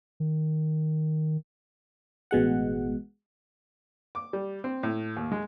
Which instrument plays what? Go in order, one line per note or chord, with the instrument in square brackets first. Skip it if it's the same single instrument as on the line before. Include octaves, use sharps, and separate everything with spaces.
[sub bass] D#3
[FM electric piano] A1 B2 G#3 F#5
[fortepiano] D6
G3
C4
A2
D#2
G#3